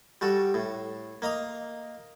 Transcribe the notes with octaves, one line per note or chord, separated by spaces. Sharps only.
G3 F#4 A4
A2
A#3 D#5 A#5 D#6